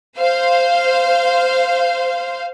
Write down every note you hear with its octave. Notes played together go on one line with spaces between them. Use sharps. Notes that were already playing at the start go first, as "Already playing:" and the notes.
C5 F5